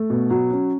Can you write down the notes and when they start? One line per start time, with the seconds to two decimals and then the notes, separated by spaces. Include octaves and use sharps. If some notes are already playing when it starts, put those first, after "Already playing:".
Already playing: A3
0.10 B2
0.30 F#3
0.51 C#4